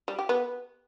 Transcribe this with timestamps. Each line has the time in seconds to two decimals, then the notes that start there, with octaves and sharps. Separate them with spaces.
0.08 G3
0.19 G4
0.29 B3